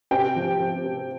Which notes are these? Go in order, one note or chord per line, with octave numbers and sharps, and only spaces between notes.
C3 G5
F3
F3
C3